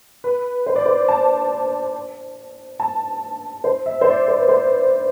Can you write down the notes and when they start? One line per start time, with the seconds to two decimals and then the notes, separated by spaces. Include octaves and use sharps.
0.24 B4
0.66 C5
0.76 D5
0.86 C5
1.08 A5
2.80 A5
3.64 C5
3.86 E5
4.01 C5
4.08 D5
4.28 C5
4.38 B4
4.48 C5